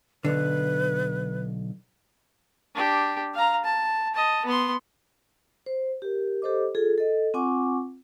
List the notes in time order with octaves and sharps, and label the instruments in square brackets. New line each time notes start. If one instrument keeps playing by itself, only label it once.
[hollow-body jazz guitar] B1 D3 [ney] B4
[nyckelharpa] D4 G4
F5 A#5
A5
D#5 A5
B3 C6
[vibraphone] C5
G4 A#4
G4 A4 C5 D#5 D6
F4 G#4 A4
A4 D#5
C4 F4 F#5 G#5 C#6 D6